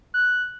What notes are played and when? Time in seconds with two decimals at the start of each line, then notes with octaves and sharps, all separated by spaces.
0.14 F#6